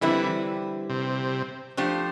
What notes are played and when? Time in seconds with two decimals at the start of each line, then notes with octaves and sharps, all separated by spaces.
0.01 D3 E3 G3 C4 E4 B4
0.90 C3
1.77 F3 A3 D4 G4 C5